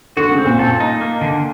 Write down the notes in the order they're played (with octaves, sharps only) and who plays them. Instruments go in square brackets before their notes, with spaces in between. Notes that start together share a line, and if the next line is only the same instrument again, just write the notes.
[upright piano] D3 [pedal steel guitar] F#4
[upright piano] C#3
[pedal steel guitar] C4
[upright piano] A#2
[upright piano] A#2 [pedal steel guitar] A4
[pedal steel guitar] D#4
A#3
D3